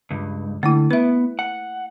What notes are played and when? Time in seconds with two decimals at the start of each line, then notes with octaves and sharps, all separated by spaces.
0.11 C#2 G2
0.63 D3 A3 A#3 E4
0.91 B3 B4 E5
1.39 F#5